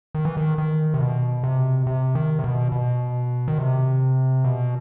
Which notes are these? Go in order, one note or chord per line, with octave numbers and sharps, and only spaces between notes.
D#3
E3
D#3
D#3
C3
B2
C3
C3
D#3
C3
B2
B2
D#3
C3
B2